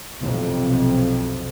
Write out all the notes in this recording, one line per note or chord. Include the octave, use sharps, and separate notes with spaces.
B1 F2 C3